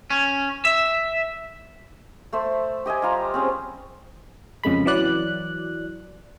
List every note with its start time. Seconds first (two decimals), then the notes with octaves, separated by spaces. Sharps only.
0.10 C#4
0.65 E5
2.33 A3 C5 E5
2.86 G4 D#5 E5 G#5
3.02 G3 F4 A#5
3.34 C4 C#4 G#4
4.63 F2 C#3 G#3 B5
4.86 E3 F#3 D5 F#6